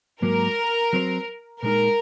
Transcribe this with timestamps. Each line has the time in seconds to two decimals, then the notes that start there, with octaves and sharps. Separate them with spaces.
0.22 G#2 F#3 A#3 A#4
0.93 F#3 C4 F#4 C5
1.63 A#2 G#3 D#4 A#4